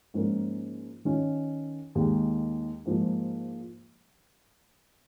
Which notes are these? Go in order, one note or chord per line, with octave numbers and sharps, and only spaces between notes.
G#2 F3 A#3 C#4 A#4
D#3 C#4 F4
D#2 D#3 G#3
G#2 F3 A#3